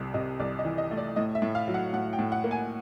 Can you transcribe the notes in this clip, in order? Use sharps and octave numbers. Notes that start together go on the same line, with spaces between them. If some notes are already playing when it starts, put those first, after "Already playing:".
Already playing: C2 C3
C3 D#5
C2 D5
D#5
E3
D#5
A3
D5
A2 D#5
E5
A2
F5
F#3
F#5
A2 F#5
G5
A2
F#5
A#3
G#5